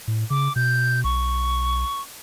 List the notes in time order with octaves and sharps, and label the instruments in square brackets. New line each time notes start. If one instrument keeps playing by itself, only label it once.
[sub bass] A2
[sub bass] C#3 [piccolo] D6
[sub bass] B2 [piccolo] G6
[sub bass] B1 [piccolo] C#6